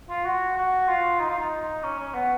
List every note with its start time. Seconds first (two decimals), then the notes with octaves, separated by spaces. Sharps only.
0.09 F4
0.25 F#4
0.57 F#4
0.88 F4
1.20 D#4
1.29 F4
1.39 D#4
1.83 C#4
1.98 C#4
2.14 B3